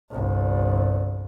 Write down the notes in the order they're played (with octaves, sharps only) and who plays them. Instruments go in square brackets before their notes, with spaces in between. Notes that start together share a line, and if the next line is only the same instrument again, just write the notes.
[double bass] G1 C2